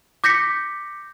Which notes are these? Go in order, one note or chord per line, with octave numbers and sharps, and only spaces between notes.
D6 G6 A#6 B6 C#7